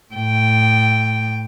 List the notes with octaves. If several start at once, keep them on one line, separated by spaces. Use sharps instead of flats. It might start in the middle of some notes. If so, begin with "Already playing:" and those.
A2 G5